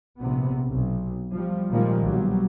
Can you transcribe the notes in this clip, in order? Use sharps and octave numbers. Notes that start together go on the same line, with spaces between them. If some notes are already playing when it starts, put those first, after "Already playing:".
A#1 C3 B3
B1
F3 G3
A#2 D#3 F3 G3 G#3 A#3
B1 F#3 G3